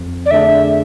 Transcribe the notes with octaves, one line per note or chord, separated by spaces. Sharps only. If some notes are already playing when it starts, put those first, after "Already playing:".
Already playing: F2
D5
D3 A3 D4 G#4 E5